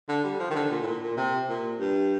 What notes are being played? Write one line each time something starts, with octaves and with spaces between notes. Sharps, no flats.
D3
G3
F3
D#3
D3
A#2
A2
A#2
A#2
C3
A#2
G2